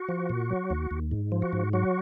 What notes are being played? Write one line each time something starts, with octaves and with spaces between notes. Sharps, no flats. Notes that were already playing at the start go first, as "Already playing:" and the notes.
Already playing: F#4
F3
A#2
F#3
D#2
D#2
G#2
F3
F#4
G#2
F#3 F#4